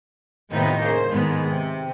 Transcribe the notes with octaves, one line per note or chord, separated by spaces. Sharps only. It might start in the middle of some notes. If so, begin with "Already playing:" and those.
A2 C3 D#3 B3 D#4 F4
C#3 A#3 C5
G#2 D3 D#3 G#3 B3
C3